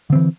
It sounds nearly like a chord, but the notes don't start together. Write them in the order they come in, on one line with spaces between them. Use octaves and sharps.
D3 C4 E3